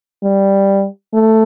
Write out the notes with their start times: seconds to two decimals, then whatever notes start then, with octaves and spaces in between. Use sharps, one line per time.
0.23 G3
1.13 A3